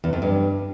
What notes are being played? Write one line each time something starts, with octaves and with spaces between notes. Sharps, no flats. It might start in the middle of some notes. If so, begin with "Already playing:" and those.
E2
F2
G2